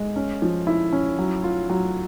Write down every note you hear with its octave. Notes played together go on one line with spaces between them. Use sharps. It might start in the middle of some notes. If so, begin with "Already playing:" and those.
Already playing: G#3
C#4
F3
E4
C#4
F#3
F4
F#3